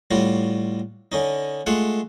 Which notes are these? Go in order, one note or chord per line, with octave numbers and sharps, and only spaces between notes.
A2 G3 F4 F#4
D3 C#4 D#4
G#3 A3 F4 F#5